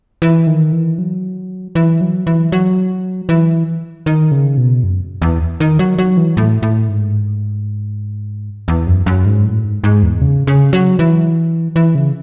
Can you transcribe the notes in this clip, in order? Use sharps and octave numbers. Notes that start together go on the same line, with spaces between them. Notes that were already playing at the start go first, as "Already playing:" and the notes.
E3
D#3
E3
F#3
E3
F#3
E3
F#3
E3
D#3
C#3
B2
F#2
E2
D#3
F#3
F#3
E3
A2
A2
G#2
E2
F#2
F#2
G#2
A2
G#2
G#2
E2
C#3
C#3
F#3
E3
E3
C#3